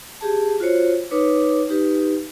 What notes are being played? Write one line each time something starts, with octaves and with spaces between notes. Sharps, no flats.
G4 G#4 A5
F4 F#4 C5 C#5
D#4 B4 C#5 D6
D#4 G4 B4